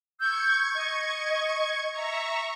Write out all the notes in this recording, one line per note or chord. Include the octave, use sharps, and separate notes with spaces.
C#6 E6 G6 G#6
D#5
E5 A#5 C#6